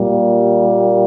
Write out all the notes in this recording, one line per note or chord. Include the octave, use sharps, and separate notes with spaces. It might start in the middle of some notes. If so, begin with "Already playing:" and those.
Already playing: A#2 G3 A#3